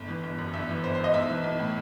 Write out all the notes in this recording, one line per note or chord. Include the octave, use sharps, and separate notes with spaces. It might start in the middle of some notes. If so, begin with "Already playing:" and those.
Already playing: G1
E3
G1
F#2
G1 E5
E3
G1 C5
F#2 C5
D#5
B1 E5
E3
B1
A2